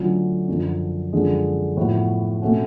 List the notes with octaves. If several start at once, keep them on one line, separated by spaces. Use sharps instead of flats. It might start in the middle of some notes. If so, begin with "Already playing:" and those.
Already playing: D3 F#3 A3 C#4 F4
F#2 D3 F3
F#2 D3 F3 G#3
A2 F3 B3 F#4 B4
B2 A3 C#4 F#4